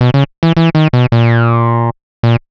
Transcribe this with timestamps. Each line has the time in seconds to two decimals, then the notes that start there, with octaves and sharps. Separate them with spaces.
0.01 B2
0.14 C#3
0.43 E3
0.57 E3
0.75 D#3
0.93 B2
1.12 A#2
2.23 A#2